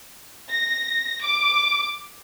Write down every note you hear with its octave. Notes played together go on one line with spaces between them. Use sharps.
A#6
D6